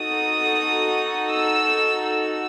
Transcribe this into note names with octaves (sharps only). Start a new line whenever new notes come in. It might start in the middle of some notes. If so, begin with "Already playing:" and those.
Already playing: D#4 F#4 A4 D#6
E6
E6